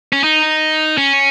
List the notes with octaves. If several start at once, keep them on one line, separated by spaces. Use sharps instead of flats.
C#4
D#4
C#4